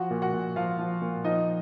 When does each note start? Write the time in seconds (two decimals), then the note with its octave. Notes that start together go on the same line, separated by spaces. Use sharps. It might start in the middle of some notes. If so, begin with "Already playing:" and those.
Already playing: F3 F#4 F#5
0.10 A#2
0.22 F#4 F#5
0.33 A#2
0.56 F3 F4 F5
0.79 F3
1.01 A#2
1.24 F3 D#4 D#5